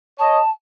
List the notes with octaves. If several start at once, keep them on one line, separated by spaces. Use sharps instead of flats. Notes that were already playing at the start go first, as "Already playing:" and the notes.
C#5 D#5 A5